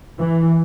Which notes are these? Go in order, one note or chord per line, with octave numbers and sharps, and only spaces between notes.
E3